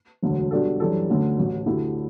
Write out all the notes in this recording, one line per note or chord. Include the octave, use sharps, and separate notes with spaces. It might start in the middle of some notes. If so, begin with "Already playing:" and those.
E1 D2 D3 F#3
B2 G3 D4 F#4 A4
F#2 E3 G3 D4 A4
D2 D3 A3 C#4
A1 A2 F#3
D2 D3 A3 E4 G4